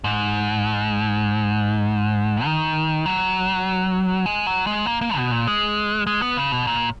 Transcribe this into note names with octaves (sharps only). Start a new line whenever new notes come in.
G#2
D#3
F#3
G#3
F#3
G#3
A#3
A#3
B2
A#2
G#3
G#3
B3
C#3
B2
A#2